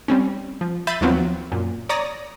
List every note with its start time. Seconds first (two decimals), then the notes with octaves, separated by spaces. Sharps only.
0.08 G3 C4 C#4
0.61 F3
0.87 E5 B5 G6 A6 C7 D#7
1.01 D#2 F3 F#3 B3 C4
1.52 F#2 A#2
1.89 C#5 D5 A#5 D#6 A#6